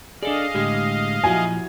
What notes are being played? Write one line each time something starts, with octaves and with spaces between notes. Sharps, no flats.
D4 G#4 A4 D5 D#5 F5
A2 D3 G#3 G4
A#2 F3 F#3 E4 F#4 G#5